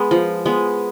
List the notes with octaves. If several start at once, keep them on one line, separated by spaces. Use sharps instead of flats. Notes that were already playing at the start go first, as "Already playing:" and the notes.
Already playing: G#3 B3
F3
G#3 B3